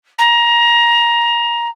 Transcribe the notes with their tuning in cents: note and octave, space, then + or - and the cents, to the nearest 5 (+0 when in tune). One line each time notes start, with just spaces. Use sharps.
A#5 +20